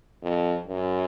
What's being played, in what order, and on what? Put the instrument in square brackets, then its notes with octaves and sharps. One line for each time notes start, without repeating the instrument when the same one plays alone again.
[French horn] F2
F#2